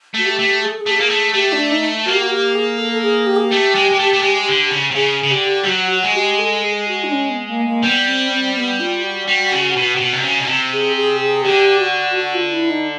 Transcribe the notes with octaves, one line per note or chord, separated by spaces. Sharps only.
A3 F#4
G4
A3
G#4
A4
G#4
A3 G4
A#3 G#4
A3
A3 G4
D4
D#4
A#3 F#4
G4
F#4
G4
G#4
A4
A4
G#4
G4
G#4
G4
A3
G#3
G#3
A3
A3
G#3
D3
C#3
C3
C#3 G#4
C#3
D3 G4
G3
F#3 F#4
F#4
G#3
G4
A4
G#4
F#4
D4
C#4
B3
A#3
A#3
G3 B3
C4
C4
B3
F4
F#4
G3
C#3
B2
C3
B2
C3
C#3
B2
C3
G#4
G#4
G#4
D3 G4
F#4
F#4
F4
E4
D#4